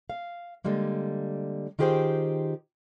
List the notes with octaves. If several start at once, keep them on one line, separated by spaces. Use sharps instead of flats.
F5
D3 G3 G#3 A#3
D#3 F4 G4 G#4 C5 G5